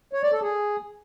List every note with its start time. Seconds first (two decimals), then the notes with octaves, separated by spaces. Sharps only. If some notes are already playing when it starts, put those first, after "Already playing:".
0.13 C#5
0.22 D5
0.32 A4
0.42 G#4